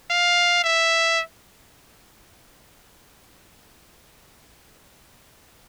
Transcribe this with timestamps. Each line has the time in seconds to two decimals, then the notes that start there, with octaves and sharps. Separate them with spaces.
0.10 F5
0.64 E5